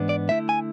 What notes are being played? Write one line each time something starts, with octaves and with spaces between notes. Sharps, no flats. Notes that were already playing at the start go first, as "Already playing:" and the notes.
Already playing: G#2 E3 B3 D4
D5
D3 A3 E4 E5
G#5